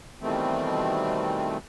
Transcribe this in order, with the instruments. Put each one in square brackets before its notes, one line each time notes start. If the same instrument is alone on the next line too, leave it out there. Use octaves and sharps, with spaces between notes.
[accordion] B2 D#3 E3 G3 A3 C4